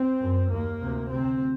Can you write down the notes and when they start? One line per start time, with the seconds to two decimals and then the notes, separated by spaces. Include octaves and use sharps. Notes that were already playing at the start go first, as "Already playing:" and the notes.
Already playing: C4
0.21 F#2
0.51 D#2 A#3
0.81 D2 C3
1.11 D2 C3 C4